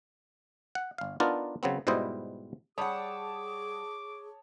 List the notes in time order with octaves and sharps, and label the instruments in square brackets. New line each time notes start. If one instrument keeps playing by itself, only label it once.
[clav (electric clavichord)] F#5
G1 F5
B3 D4 D#4 F4 A#4 D5
C#3 F#3 B3 C4
G#2 B2 G3 E4 C5 D#5
[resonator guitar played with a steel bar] G3 F#5 [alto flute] G#4 [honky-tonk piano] C#5 A5 D#6 [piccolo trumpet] D6